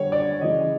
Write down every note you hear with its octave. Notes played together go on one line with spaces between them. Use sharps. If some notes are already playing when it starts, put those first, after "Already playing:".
Already playing: D3 G3 C#5
D5
C#3 E3 G#3 D#5